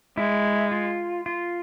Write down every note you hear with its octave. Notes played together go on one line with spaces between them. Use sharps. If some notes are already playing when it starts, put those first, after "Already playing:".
G#3 E4
F4
F4